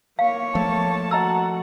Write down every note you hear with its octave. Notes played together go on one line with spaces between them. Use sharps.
A#3 C#5 F5
F3 A3 A5
F#4 D#5 F#5 A#5 E6